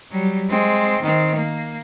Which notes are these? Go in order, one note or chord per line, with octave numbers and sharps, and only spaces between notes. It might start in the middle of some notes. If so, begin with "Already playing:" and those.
F#3 G3
G#3 C4
D#3 C4
A#3